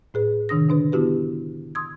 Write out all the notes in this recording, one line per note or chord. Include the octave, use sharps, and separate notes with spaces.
A2 G#4 B4
C3 D#3 D4 D#6 A#6
D3 D4 B4
B3 E4 F#4 G4 B4
C6 D#6 E6 G#6